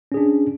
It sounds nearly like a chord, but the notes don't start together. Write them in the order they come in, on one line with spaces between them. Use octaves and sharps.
C#4 G#4 D4